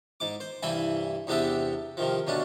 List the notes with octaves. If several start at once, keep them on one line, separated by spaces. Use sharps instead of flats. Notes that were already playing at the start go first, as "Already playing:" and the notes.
G#2 D6
C5
C2 G2 E3 E4 G#5 B5
E2 C3 B3 D4 G4 E5
C3 D#3 F3
D2 B2 C#4 D4